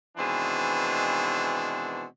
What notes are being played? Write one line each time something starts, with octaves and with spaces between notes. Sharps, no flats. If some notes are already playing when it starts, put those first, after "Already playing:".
B2 D#3 E3 G#3 C4 D4